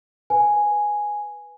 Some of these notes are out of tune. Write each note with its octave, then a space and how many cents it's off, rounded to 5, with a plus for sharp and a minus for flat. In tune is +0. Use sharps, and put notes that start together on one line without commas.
B4 +0 G#5 +0